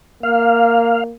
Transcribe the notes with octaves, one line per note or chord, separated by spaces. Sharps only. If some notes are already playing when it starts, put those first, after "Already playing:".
A#3 F5